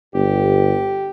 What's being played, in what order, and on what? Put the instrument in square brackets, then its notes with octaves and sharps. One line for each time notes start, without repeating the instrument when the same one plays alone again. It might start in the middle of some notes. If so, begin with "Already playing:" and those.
[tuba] G1 [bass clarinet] G4